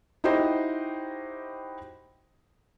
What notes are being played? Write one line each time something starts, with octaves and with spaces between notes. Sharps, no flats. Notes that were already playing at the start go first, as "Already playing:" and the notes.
D#4 E4 F#4 G4 C5 D#5